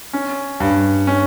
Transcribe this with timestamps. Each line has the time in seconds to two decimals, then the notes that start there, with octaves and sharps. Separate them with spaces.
0.13 C#4
0.60 G2
1.07 C#4